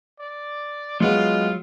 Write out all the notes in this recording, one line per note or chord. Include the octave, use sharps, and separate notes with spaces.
D5
F#3 G#3 B3 F4